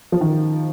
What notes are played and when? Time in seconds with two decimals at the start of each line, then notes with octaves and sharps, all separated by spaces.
0.12 F3
0.21 D#3